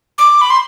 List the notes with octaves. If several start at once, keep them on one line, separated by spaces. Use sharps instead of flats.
D6
B5
C6